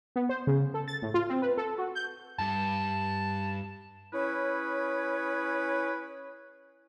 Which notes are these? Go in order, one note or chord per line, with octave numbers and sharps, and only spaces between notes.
B3
C5
C#3
A4
A6
A2
F4
C4
B4
A4
F#4
G6
G2 A5
C#4 E4 G#4 B4 C#5